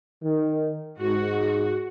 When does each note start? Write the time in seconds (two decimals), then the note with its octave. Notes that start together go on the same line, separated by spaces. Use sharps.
0.23 D#3
0.99 G#2 F#4